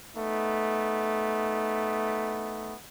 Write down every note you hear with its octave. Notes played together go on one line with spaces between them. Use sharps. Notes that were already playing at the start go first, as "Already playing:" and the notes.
A3 B3 D#4